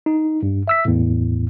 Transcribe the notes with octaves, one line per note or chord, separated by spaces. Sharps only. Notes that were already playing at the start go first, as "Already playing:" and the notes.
D#4
G2
E5 E6 B6
E2 A2